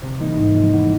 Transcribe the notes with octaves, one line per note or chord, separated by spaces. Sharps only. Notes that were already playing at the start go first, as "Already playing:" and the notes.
C3
E3 G3 A#3 D#4
G#2
F3 G#3
E2